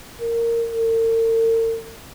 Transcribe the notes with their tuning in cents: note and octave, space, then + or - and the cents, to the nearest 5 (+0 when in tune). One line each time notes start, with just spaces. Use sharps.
A#4 -10
A#4 -45